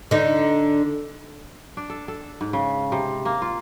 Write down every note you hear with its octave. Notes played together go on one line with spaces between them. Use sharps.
D3 D#4
D4
A4
A4
G#2
C#3
C3
A#3
F4